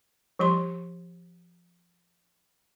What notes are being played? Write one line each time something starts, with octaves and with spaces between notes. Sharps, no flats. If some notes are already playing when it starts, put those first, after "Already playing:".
F3 G3 G4 C6